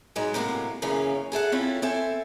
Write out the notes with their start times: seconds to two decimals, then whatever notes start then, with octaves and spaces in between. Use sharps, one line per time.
0.16 G#2 F#3 G#3 B3
0.34 A2 C3 F#3 A#3 B3
0.82 F#2 C#3 E3 A#3 C#4
1.32 G#4 A4 E5 F#5
1.52 C4 C#4 E4 F4 A4 C#5
1.82 C4 A4 E5 G#5